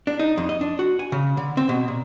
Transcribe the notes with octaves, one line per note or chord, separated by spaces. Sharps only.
D4
D#4
F2
D#5
D4
F#4
G#5
C#3
D3
C4
B2
A#2